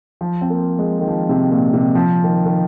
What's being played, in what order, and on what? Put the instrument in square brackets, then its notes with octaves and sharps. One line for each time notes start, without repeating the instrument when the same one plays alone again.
[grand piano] F3
C4
A#3
G#3
D#3
F3
C3
A#2
C3
F3
D#3
D#3